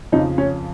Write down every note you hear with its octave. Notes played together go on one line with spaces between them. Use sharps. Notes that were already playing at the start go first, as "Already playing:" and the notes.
F2 C#3 F3 D#4
C#4